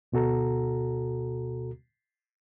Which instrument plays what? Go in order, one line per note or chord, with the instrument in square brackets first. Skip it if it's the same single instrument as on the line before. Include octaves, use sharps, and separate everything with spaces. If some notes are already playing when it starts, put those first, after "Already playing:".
[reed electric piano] D2 B2 F#4 A4 A#5